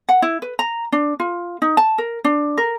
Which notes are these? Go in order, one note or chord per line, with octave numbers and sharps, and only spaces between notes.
F#5
E4
B4
A#5
D4
F4
D#4
A5
A#4
D4
A#4